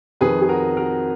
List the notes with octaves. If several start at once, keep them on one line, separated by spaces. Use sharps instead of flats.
F2 D#3 G#4 B4
G#4
F#4 A#4
F#4 A#4